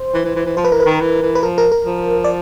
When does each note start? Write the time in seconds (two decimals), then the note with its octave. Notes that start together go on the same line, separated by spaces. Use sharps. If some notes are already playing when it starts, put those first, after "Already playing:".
Already playing: C5
0.14 E3
0.25 E3
0.36 E3
0.46 E3
0.57 F3 C5
0.65 B4
0.71 E3 A#4
0.80 B4
0.86 D#3
1.00 E3
1.22 E3
1.35 B4
1.43 F3 A#4
1.58 A#4
1.72 A#4
1.86 F3
2.24 D5